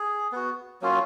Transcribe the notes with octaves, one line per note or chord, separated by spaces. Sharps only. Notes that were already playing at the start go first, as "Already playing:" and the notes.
Already playing: G#4
B3 F#4
F#3 A#3 C#4 F4